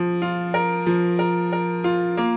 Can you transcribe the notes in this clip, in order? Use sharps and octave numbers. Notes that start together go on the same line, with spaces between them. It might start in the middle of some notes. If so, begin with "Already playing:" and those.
Already playing: F3
F4
A#4
F3
A#4
A#4
F4
A#3